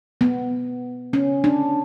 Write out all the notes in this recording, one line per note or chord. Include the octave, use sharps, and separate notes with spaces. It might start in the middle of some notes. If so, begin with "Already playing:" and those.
B3
C#4
D4